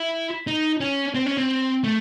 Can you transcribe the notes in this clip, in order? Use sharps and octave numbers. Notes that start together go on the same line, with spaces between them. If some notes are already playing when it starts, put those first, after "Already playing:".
Already playing: E4
D#4
C#4
C4
C#4
C4
A3